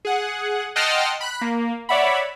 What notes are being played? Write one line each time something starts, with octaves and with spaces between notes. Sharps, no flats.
G#4 F#5
D#5 F#5 G5 A5 C6 F6
B5 F#6
A#3
C#5 D5 E5 F#5 B5